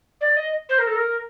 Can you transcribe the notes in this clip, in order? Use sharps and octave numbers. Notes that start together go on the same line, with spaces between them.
D5
D#5
C5
A#4
A4
A#4